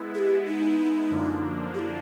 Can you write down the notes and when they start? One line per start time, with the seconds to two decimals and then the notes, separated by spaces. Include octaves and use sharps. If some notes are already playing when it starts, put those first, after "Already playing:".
Already playing: G#3 B3 E4
0.14 G#4
0.18 G4
0.47 D#4
1.10 F#2 D3 F3 A#3 D4
1.74 G4
1.79 E4